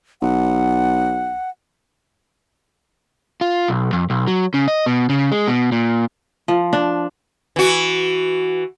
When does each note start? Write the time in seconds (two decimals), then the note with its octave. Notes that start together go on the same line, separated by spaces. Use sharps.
0.22 B1 F#5
3.41 F4
3.68 B1
3.93 F2
4.10 B1
4.27 F#3
4.54 C#3
4.68 D#5
4.86 B2
5.09 C#3
5.32 G#3
5.48 B2
5.72 A#2
6.48 F3
6.73 D4
7.56 E3 F#4